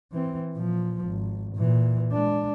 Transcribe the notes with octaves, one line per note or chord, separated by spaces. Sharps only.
E3 C4
A#2 F3
G#1
A#2 E3
G#3 D4